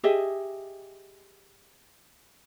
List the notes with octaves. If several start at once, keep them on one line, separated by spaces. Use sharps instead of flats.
G4 G#4 D#5 E5